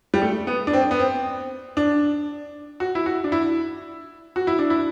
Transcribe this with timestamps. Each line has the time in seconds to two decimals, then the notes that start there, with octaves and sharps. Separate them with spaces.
0.14 G3
0.22 A3
0.47 B3
0.67 D4
0.73 C4
0.91 B3
0.99 C4
1.77 D4
2.80 F#4
2.95 E4
3.06 F#4
3.24 D4
3.32 E4
4.36 F#4
4.47 E4
4.59 D4
4.70 E4